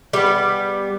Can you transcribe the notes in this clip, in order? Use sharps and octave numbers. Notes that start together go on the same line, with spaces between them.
G3 B3